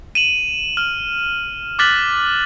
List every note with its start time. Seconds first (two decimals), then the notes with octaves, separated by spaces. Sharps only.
0.15 D#7 E7 F#7
0.77 F6
1.79 D6 F6 F#6 A6 B6 F#7